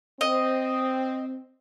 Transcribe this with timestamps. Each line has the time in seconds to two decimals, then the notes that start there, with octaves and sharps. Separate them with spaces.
0.21 C4 D#5